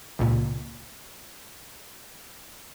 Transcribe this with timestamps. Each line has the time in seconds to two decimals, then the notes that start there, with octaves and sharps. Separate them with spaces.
0.19 C#2 A#2